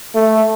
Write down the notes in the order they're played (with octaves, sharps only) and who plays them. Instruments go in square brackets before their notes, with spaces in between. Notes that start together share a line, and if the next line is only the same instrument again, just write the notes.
[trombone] A3